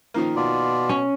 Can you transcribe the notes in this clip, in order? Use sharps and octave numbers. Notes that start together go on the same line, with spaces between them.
D#3 F3 A#3
B2 F4 D5
C#4 C#6